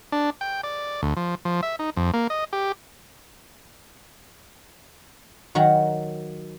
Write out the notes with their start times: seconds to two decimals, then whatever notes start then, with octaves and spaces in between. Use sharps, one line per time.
0.12 D4
0.41 G5
0.64 D5
1.03 D2
1.17 F3
1.45 F3
1.63 E5
1.79 D#4
1.97 F2
2.14 A#3
2.30 D#5
2.53 G4
5.55 D#3 F#3 F#4 F#5 A#5